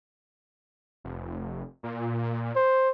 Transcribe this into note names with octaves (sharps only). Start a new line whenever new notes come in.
F1
A#2
C5